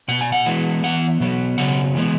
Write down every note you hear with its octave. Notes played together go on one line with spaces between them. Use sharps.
B2 B3 F#5
G#5
F#5
E3 G#3 B3
E3 B3 F#5
B2 F#3 B3
C#3 F#3 B3 F#5
E3 G#3 B3